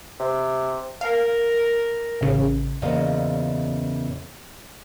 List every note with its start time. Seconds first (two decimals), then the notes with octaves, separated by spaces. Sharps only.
0.20 C3
1.01 A#4 F5
2.21 A1 C#3
2.82 E2 A#2 C#3 C#4 C5 D#5